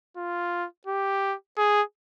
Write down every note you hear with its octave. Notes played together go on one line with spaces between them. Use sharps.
F4
G4
G#4